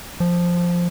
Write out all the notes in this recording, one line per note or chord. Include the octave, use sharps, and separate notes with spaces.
F3